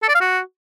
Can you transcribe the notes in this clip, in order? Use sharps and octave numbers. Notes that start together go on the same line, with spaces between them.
A4
D5
F5
F#4